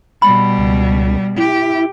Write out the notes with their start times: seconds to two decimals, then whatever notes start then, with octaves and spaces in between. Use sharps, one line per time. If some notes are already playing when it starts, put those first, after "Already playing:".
0.22 B2 G3 B5
0.58 C#2
1.38 E4 G4